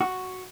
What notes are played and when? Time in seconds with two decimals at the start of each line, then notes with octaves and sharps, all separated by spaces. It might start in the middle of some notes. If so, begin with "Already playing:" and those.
0.01 F#4